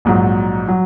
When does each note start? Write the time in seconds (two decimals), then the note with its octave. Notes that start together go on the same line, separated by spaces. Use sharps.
0.05 A#1 G#2 F#3
0.68 F#3